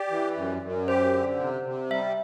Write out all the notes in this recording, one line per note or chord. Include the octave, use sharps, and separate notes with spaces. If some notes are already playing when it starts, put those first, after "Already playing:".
Already playing: G4 D5
E3
F#2
F#2
G4 C5
D3
C3
C3
G3 E5